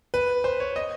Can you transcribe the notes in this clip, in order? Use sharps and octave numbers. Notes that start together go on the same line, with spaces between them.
B4
C5
C#5
D#5